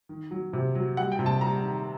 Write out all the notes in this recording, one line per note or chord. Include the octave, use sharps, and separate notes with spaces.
D#3
F#3
C3
F#3
G3 F#5
G5
C3
A5
G3 A#5
D#3